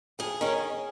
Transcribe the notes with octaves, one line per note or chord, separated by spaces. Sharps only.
F2 G#4
D#3 C#4